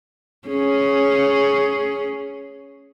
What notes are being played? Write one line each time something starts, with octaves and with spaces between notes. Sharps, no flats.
C#4 G#4